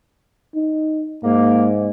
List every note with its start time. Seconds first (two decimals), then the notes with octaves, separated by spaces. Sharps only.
0.55 D#4
1.24 G#2 A#3